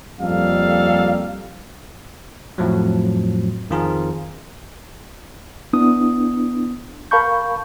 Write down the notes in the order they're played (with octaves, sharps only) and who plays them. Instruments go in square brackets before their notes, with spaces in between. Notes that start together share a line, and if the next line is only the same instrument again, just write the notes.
[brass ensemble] F2 G3 A#3 A4 F5
[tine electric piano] F2 A2 F3 F#3
F2 D#3 F3 F4 G#4 A#4
[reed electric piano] B3 D4 E4 D#6
A#4 F5 A5 B5 C#6 G6